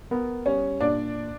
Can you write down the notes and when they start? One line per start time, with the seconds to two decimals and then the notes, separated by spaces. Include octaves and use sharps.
0.11 B3 A#4
0.46 G3 C#4 C#5
0.81 A#2 D4 D5